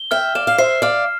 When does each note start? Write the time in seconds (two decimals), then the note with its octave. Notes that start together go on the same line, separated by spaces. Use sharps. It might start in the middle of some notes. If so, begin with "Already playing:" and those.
Already playing: G7
0.11 E5 G5 F6
0.35 D5 F5 E7
0.47 F5
0.58 C5 E5 C7
0.82 D5 F5 F6